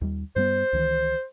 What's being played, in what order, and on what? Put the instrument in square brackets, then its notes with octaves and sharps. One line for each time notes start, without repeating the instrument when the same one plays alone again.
[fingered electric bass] D#2 G3
[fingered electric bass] G2 G3 B3 [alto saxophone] C5
[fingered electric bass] C#2 D#3 E3